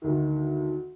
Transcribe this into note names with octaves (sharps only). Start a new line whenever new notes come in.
D2 D#3